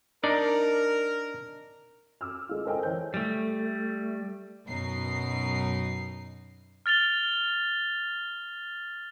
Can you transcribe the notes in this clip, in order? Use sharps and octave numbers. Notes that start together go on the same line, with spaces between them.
D4 D#4 A#4 D5
D6 E6 F6
G#3 F4
A4 A#4 C5 D#5 G5 G#5
E3 C5 C#5 G5 G6
G3 A3
F#2 B2 D#4 C7
F6 A6 F7 G7